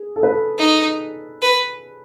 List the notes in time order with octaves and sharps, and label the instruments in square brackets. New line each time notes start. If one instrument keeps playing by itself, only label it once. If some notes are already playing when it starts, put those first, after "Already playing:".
Already playing: [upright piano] G#4
A4
B4
A4
[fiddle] D#4
B4